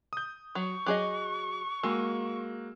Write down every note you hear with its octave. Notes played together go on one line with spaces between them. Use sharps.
D#6 G6
F#3 C#6
F#3 G#4 D#5 D6 F#6
G#3 A#3 F#4 E6